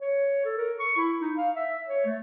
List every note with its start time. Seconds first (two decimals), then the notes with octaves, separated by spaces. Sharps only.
0.01 C#5
0.45 A4
0.57 A#4
0.79 C#6
0.97 E4
1.21 D#4
1.37 F5
1.54 E5
1.88 C#5
2.05 A3